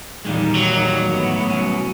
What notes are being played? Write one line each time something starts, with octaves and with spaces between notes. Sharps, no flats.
E2 A#2 D#3 G3 G#3 D#4
F#3
A2 B3
C2 C#4